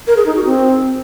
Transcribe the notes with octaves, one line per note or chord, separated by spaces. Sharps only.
A#4
G#4
D#4
F#4
C4